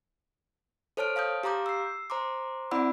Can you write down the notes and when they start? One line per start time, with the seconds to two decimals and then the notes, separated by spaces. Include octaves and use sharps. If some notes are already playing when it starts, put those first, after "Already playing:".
0.97 A4 C5 C#5 A5 F6 D7
1.16 F5 A5 D#6 G6
1.43 G4 F5 A#5 D6 G6
1.66 E6 C7
2.10 C5 A#5 C6 D6
2.71 C4 E4 D5 F#5 B5 E6